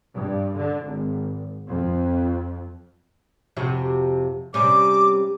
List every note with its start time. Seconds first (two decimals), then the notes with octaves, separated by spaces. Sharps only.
0.13 G2
0.55 D3
0.85 G#1
1.68 F2
3.57 F2 C3 F#4
4.54 C3 G3 C#4 D6